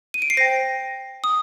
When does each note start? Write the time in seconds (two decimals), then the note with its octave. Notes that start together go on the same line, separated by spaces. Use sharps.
0.14 D#7
0.22 D7
0.30 C7
0.37 C5 G5 A#6
1.24 D#6